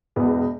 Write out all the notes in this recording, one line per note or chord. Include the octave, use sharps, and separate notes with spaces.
E1 E2 B2 B3